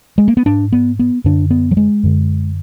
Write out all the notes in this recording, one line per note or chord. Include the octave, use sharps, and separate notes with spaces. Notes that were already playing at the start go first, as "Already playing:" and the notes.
G#3
A#3
B3
G#2 D4
B3
B3
F#2 D3 D4
B3
F#3
G#3
F#2 D3